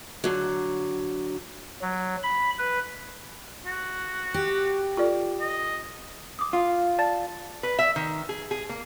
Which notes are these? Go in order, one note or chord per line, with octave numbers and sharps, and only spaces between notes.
D3 F#3
F#3
B5
B4
F#4
G4
F4 A4 D5
D#5
D6 D#6
F4
D5 A5 A6
B4
E5
D#3
G#4
G#4
A#3